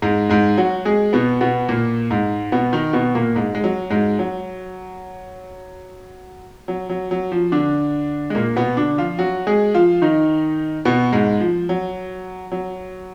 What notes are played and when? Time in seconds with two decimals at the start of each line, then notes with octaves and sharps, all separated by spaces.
0.02 G#2 G#3
0.29 G#2 G#3
0.57 F#3 F#4
0.85 G#3 G#4
1.13 B2 B3
1.41 B2 B3
1.69 A#2 A#3
2.10 G#2 G#3
2.52 B2 B3
2.73 D#3 D#4
2.93 B2 B3
3.15 A#2 A#3
3.35 G#2 G#3
3.55 G#3
3.64 F#3
3.90 G#2 G#3
4.19 F#3
6.68 F#3
6.90 F#3
7.11 F#3
7.32 F3
7.52 D3 D4
8.30 G#3
8.35 A#2 A#3
8.56 B2 B3
8.77 D3 D4
8.98 F3 F4
9.19 F#3 F#4
9.47 G#3 G#4
9.74 F3 F4
10.02 D#3 D#4
10.85 B2 B3
11.13 G#2 G#3
11.40 F3
11.69 F#3
12.52 F#3